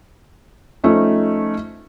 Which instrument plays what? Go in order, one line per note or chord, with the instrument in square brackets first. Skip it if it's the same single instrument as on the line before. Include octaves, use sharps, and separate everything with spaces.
[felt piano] F3 A3 C#4 D#4